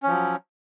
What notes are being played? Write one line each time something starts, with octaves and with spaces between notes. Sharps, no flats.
F3 F#3 C#4